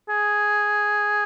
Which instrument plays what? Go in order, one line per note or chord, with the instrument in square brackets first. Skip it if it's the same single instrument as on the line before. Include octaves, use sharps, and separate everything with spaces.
[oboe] G#4